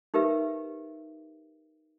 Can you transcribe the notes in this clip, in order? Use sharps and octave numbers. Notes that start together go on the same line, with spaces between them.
D#4 G4 A#4 B4 E5